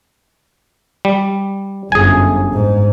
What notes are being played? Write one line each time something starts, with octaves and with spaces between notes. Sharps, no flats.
G3
G1 F#2 G#4 G#5
G#2